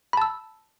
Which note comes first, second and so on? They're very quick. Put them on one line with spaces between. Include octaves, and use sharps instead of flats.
B5 A5 E6